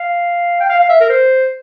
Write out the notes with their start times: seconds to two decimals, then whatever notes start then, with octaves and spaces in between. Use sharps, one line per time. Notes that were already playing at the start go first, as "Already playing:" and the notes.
Already playing: F5
0.60 G5
0.69 F5
0.80 F5
0.89 E5
1.00 A#4
1.09 C5